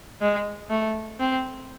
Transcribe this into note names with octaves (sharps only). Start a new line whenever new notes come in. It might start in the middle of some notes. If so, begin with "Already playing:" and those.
G#3
A3
C4